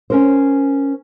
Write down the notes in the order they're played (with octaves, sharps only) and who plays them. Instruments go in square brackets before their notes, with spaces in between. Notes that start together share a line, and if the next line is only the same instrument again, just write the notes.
[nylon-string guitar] C#4 A#4 C5